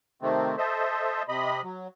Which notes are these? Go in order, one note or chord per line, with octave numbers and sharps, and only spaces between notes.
C3 D#3 A3 C4
A4 C5 D#5 E5
C3 D#5 B5
F#3